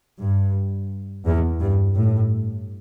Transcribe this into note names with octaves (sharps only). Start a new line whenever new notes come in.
G2
E2
G2
A2